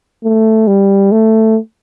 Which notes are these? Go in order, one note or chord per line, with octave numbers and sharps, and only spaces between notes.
A3
G3
A3